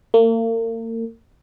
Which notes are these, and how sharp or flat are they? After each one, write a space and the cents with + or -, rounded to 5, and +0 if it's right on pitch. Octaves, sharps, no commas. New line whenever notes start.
A#3 -40